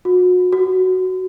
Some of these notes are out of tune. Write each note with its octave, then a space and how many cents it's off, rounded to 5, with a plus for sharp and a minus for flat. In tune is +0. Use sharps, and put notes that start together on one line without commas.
F#4 -35
F#4 +5